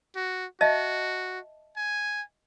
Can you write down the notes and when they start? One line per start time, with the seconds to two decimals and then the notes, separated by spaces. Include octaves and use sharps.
0.16 F#4
0.61 F#4 D#5 E5 A5
1.77 G#5